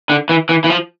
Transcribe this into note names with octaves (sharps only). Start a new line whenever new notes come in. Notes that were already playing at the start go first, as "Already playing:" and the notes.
D3
E3
E3
E3
F3